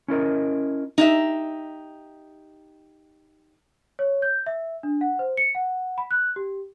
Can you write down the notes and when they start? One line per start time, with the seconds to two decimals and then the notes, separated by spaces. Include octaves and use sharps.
0.08 C#4 E4 A#4 D#5
0.98 D#4 G4 E5
3.99 C#5
4.22 G6
4.46 E5
4.83 D4
5.01 F#5
5.19 C5
5.37 C#7
5.55 F#5
5.98 B5
6.11 F#6
6.36 G4